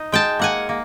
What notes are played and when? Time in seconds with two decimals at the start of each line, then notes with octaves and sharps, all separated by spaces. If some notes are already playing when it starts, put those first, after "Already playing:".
Already playing: D#4
0.12 G#3 G5 A5
0.39 A#3 F#5 G#5
0.69 A#3